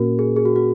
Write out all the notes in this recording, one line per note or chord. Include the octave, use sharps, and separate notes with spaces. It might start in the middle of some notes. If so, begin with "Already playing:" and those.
Already playing: A#2 A#3 C#4 F#4 A#4
G#4
G#4
F#4
F#4